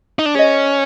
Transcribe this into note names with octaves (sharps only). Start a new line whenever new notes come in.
D#4
D4
C#4 G#4 C5 D#5